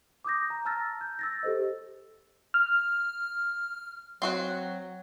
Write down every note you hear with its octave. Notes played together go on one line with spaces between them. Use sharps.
D6 D#6 G6 A#6
A#5
A5 A#5 E6 F6 A6 A#6
G6
E6 A6 A#6
G4 A4 C5 D#5
F6
F#3 C4 F#4 F#5